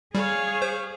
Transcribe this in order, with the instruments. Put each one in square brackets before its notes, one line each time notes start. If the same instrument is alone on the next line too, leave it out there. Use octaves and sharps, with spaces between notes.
[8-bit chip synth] G3 [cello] G#4 [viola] C#5 F5
[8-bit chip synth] C5